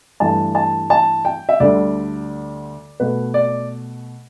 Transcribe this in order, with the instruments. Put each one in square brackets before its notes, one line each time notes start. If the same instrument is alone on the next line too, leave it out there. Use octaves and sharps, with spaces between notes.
[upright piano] G2 E3 A3 A5
A5
A5
G5
E5
D2 D3 G3 D5
B2 A3 B4
D5